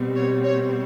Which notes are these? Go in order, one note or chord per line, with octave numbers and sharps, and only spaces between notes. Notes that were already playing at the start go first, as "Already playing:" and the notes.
Already playing: B2 G3 C4
C#5
C#5